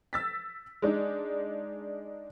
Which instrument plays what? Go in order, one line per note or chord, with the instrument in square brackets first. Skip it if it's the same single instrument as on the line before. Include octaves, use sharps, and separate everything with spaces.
[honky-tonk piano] E6 A6 B6
G#3 D4 D#4